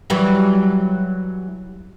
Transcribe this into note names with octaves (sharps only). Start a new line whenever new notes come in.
E3 F#3 G3